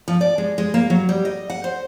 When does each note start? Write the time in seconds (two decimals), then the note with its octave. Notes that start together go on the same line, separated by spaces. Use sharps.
0.08 F3
0.21 D5
0.38 G#3
0.58 G#3
0.74 A#3
0.90 F#3
1.09 G3
1.25 D#5
1.50 F#5
1.64 C5